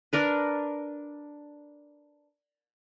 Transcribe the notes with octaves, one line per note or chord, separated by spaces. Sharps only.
D4 A#4 B4